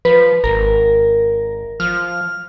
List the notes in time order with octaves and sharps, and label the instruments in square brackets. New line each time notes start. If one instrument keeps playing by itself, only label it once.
[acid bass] F3 [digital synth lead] B4
[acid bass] G#1 [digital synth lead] A#4
[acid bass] F3 [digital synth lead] F6